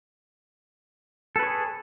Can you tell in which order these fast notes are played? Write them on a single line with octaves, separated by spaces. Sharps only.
A4 B4 C#5 G#4